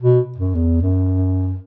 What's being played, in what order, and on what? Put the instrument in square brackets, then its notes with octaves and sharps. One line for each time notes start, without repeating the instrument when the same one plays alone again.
[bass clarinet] B2
F#2
E2
F#2